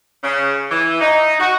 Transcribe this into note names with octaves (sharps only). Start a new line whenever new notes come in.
C#3
E3
D#4
F#4